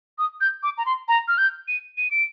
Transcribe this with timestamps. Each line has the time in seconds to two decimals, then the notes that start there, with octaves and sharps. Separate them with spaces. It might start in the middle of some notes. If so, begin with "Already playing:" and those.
0.18 D#6
0.41 G6
0.63 D6
0.78 A#5
0.86 C6
1.08 A#5
1.28 F6
1.38 G6
1.68 D#7
1.98 D#7
2.11 D7